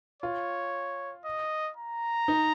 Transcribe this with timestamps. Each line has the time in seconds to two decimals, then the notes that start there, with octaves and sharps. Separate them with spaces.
0.22 F4 C#5
1.25 D#5
1.77 A#5
2.28 D#4